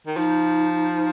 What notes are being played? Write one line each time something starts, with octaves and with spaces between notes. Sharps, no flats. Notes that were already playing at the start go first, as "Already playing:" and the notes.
D#3
F3 D#4